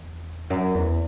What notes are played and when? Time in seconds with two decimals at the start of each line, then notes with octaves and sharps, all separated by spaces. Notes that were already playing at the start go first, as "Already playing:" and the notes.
Already playing: E2
0.50 F#2
0.74 E2